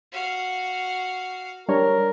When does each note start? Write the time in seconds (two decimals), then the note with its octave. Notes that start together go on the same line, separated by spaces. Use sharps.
0.12 F#4 F5
1.69 G3 D4 A#4 C#5